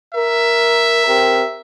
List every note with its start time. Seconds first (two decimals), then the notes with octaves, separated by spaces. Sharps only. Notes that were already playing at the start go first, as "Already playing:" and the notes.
0.15 A#4 E5
1.06 C4 G4 A#4